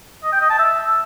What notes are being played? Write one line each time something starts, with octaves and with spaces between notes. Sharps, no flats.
D#5
G5
D#5
A5
E5